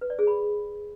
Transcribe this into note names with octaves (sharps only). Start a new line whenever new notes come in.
B4
D5
G#4
B5